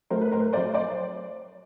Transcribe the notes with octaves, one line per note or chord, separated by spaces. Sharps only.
F#3 A3 A#4 C5
B4
A2 A#4 C5
F#3 A3 C5 D5
C5 D5